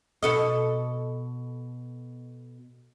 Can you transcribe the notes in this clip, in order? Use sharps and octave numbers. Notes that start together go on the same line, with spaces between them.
B2 A4 D#5